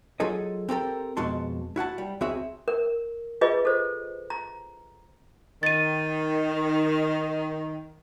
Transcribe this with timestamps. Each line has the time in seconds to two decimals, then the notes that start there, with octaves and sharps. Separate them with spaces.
0.20 F#3 F4 G#4 A4 D#5
0.69 C4 G4 A4 A#4
1.17 F2 B2 G#3 F#4 A5 C6
1.76 E4 F#4 F#5 A5
1.98 G3
2.21 C#2 C4 F#4 G#4 E5
2.68 A#4
3.41 F4 G#4 B4 D#5
3.65 A4 C5
4.30 A#5
5.63 D#3 A6 D#7